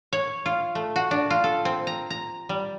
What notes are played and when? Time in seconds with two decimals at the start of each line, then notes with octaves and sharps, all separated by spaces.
0.13 C#5
0.46 F4
0.75 A3
0.96 F#4
1.11 D4
1.30 F4
1.44 A4
1.65 C4
1.87 A#5
2.10 A#5
2.49 G3